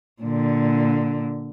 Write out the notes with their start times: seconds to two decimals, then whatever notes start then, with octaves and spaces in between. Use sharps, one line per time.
0.22 A#2 D3